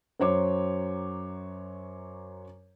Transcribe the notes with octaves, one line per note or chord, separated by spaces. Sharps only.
F#2 F#3 C5 C#5 D6